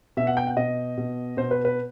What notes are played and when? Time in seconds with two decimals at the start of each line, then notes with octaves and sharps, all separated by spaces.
0.17 B2 E5
0.27 F#5
0.37 G5
0.47 F#5
0.57 B2 D#5
0.98 B2
1.37 B2 C5
1.51 B4
1.65 B4